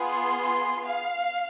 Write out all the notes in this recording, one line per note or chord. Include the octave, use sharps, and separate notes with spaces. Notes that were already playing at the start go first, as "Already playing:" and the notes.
Already playing: B3 F4 G#4
C6
F5